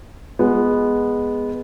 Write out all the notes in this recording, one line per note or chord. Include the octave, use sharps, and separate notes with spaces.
G#3 B3